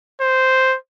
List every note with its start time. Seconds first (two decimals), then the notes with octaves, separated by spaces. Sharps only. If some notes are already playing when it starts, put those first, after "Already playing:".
0.21 C5